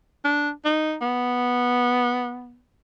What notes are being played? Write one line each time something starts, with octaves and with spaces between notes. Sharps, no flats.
D4
D#4
B3